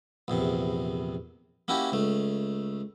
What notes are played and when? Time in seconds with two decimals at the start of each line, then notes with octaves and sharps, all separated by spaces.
0.28 A#1 E2 C3
1.68 A#3 C#4 E4 F#4 G4
1.92 C#2 A3